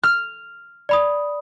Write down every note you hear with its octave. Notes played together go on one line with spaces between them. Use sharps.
F6
D5 B5 D#6